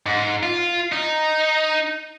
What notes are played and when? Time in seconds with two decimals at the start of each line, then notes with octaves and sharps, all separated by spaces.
0.06 G#2
0.43 F4
0.92 D#4